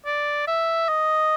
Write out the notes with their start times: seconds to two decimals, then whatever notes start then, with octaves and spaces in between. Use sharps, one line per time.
0.06 D5
0.47 E5
0.89 D#5